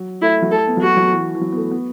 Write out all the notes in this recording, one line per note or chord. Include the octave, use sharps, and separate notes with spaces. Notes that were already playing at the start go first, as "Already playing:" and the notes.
Already playing: F#3
A3 E4
F#3
A3 A4
B3
F#3
A3 F#4
F#3
E3
E3
F#3
B3
A3
B3